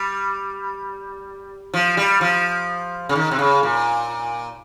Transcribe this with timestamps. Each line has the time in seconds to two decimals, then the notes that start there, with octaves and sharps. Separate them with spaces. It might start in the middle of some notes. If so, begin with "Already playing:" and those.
Already playing: G3
1.74 F3
1.97 G3
2.21 F3
3.09 C#3
3.16 D#3
3.31 C3
3.39 C#3
3.63 A#2